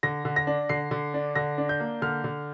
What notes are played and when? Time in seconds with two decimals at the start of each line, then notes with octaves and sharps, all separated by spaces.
0.03 D3 A#6
0.25 D3
0.36 A#6
0.47 D4
0.69 D3 C7
0.91 D3
1.14 D4
1.35 D3 A#6
1.58 D4
1.69 G6
1.80 A#3
2.02 D3 F6
2.24 D3